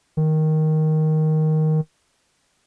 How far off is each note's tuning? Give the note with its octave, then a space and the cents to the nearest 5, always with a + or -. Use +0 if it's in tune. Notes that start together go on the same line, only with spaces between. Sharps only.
D#3 +5